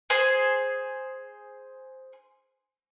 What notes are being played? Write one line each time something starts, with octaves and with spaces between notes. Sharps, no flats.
G#4 C5